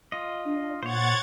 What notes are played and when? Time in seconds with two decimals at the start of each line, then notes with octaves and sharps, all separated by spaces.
0.12 F4 D#5
0.45 D4
0.83 A#2 C5 C#5 F#5 G#6 A6